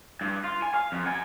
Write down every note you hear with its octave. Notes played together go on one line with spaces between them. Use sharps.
G2
F4
G#5
F5
F2
F#5 G#5